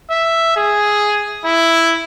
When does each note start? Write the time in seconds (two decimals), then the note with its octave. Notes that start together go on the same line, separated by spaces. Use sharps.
0.10 E5
0.56 G#4
1.45 E4